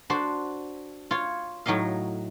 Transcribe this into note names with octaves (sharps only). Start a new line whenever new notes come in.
D4 F#4 C5
F4 C#5
A2 F#3 D#4 D#5 F5